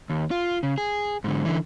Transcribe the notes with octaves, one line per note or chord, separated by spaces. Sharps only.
D#2
F4
C#3
G#4
G#2 D3
D3 E3